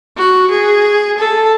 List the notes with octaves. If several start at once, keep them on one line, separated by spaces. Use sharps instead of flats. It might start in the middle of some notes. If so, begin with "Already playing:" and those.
F#4
G#4
A4